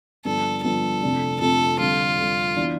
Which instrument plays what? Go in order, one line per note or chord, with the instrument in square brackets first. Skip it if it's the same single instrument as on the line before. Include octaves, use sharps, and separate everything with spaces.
[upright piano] G2 D3 F3 B3 [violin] A4
[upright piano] G2 D3 F3 B3 [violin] A4
[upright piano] F2 C3 F3 A3 D4
[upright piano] F2 C3 F3 A3 D4 [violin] A4
[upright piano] F2 D3 G3 [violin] F4
[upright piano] F2 D3 G3
E3 B3 D4